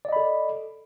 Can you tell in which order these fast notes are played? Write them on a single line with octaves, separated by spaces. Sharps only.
D5 D#5 B5 A4